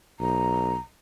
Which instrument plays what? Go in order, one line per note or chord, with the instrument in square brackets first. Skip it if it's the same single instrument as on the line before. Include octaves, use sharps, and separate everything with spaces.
[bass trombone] B1 [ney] A#5